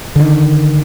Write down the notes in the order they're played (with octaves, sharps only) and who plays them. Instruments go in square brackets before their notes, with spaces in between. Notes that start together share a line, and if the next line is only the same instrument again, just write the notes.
[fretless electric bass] D3 D#3